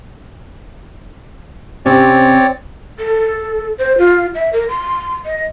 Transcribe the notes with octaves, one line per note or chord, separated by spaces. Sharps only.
C3 C4 C#4 C#5 D5
A4
C5
F4
E5
A#4
C6
D#5